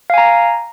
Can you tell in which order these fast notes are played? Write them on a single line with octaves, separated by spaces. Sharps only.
F5 G#5 A#5